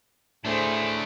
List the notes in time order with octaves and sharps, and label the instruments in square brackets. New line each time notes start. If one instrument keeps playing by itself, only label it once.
[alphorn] A2 [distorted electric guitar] A3 D4 [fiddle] G#4 C5